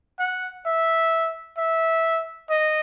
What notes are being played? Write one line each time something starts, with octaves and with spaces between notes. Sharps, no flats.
F#5
E5
E5
D#5